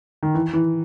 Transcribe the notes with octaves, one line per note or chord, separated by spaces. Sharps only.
D#3
E3
E3